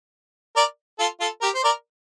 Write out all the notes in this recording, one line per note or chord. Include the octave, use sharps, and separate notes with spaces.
A#4 D5
F4 A4
F4 A4
G4 A#4
C5
A#4 D5